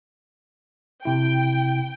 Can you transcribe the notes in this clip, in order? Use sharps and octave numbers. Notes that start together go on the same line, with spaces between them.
C3 E4 G5